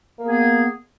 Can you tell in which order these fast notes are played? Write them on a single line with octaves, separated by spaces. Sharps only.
A#3 B3 G#4